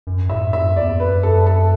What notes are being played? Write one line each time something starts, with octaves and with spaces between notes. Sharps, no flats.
F#2
A2 E5
F#2 E5
E2 D5
F#2 B4
A4
A4